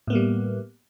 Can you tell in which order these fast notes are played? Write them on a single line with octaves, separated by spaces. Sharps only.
A2 B3 A#3 G3